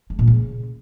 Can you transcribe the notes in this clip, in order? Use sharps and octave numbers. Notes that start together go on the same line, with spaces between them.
G#3
A#2
C#3